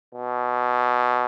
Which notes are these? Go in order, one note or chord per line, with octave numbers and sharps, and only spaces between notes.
B2